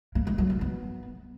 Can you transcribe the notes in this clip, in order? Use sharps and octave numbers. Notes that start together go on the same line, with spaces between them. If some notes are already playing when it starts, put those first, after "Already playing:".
A#3
G#3
F#3
D#3
B3